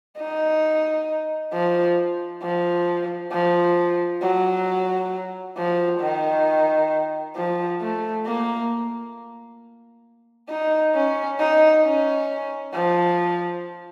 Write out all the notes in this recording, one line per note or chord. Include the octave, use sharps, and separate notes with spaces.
D#4
F3
F3
F3
F#3
F3
D#3
F3
A3
A#3
D#4
C#4
D#4
C#4
F3